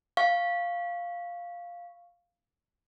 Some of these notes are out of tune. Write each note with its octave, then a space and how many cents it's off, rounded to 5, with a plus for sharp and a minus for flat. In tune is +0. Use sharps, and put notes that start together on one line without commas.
F5 +0 C#6 +0